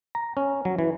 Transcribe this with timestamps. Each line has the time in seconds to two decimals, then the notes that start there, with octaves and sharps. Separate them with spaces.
0.15 A#5
0.37 C#4
0.65 F#3
0.79 E3